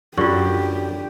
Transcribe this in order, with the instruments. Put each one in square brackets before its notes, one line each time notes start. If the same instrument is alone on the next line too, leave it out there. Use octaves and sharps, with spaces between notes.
[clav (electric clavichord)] F#2 [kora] D3 [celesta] F4 C#6 [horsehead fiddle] G4